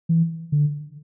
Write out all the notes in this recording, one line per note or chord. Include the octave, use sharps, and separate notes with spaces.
E3
D3